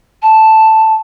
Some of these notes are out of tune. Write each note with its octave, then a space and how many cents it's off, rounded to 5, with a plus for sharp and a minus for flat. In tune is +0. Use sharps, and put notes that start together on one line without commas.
A5 +0